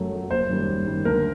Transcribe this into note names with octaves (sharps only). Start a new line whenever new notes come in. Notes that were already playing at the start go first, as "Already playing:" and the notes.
Already playing: F#2 F#3 A3
F#3 A3
F#1 C5
F#2 D#3 G3
F#1
F#2 D#3 G3
D2 A#4